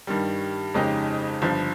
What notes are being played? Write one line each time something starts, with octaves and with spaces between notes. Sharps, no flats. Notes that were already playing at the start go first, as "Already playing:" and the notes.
G2 D#3 G3
F2 C#3 G#3 D#4 G4
G1 G2 F3